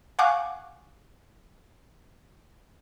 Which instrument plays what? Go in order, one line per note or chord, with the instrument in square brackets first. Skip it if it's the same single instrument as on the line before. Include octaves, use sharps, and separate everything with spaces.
[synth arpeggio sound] F5 F#5 G#5 C#6 D6 F#6